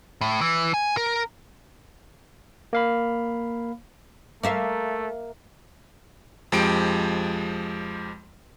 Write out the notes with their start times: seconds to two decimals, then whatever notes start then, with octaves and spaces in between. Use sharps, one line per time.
0.21 A2
0.41 E3
0.74 G#5
0.97 A#4
2.73 A#3 F5 B5
4.43 A3 A#3 E5 F5
6.52 F2 F3 G#3 G4 D7